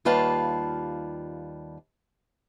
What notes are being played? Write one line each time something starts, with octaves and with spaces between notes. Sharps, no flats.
D#2 G3 F4 B4 F5 A5